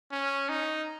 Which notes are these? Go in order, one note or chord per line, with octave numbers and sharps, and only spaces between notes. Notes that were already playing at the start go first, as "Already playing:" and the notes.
C#4
D#4